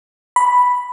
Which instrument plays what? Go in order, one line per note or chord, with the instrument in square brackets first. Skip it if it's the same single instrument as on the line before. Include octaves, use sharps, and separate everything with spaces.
[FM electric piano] B5